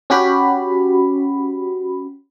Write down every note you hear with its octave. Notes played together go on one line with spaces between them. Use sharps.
C#4 F#4 G4 B5